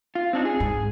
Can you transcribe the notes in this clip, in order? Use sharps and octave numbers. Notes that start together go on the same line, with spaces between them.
F4
C4 D4 D#4
G#4
G#2